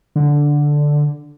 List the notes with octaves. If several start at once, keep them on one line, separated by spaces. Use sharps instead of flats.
D3